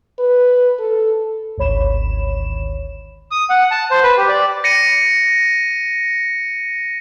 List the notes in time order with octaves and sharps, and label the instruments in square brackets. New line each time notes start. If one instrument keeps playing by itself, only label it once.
[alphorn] B4
A4
[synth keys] G#1 D2 C#5 B5 E7
[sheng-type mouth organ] D#6
F#5
A5
C5
B4
G4
D5
[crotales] A#6 C#7 D#7